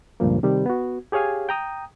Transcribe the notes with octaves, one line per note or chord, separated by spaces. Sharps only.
C#2 G2 A#2 F3 A#3
C3 D#3 G3
B3 F#4
G4 G#4 C#5 F5 G#5
G5 A#5 D#6